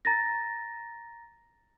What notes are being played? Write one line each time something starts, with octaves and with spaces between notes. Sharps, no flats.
A#5 A6 A#6